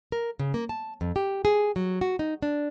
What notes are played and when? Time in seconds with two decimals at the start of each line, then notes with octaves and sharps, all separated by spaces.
0.12 A#4
0.39 C#3
0.54 A#3
0.69 A5
1.01 F2
1.16 G4
1.45 G#4
1.76 F#3
2.01 F#4
2.19 D#4
2.42 D4